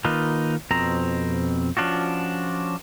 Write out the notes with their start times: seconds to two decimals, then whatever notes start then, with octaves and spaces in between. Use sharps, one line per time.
0.05 D#3 A#3 D#4 F4 B4
0.71 F2 B2 C4 A#5
1.77 F3 C#4 D4 F4 F#4